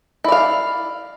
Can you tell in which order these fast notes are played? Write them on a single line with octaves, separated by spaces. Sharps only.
E4 D5 F5